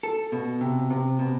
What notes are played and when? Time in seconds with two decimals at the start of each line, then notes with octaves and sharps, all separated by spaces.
0.03 A4
0.32 B2
0.61 C3
0.90 C3
1.19 B2